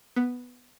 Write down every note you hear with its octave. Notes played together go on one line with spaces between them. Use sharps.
B3